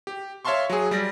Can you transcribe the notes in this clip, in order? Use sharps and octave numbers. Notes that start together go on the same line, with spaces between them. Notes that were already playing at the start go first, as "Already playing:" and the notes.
G4
C#5 E5 F5 A5 C6 C#6
F#3 G#4
G3 D5 A#6